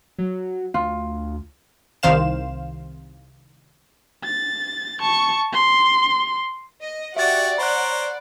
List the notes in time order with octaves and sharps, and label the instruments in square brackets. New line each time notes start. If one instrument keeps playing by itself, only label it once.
[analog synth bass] F#3
[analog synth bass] D2 [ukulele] F4
[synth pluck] C2 C3 D#3 C5 F5 E7
[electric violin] A6
A5 C#6
C6
[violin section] D#5
[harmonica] F#4 G4 [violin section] D5 F#5 [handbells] E5 A6
[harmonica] C5 C#5 A#5 [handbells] B5 F#6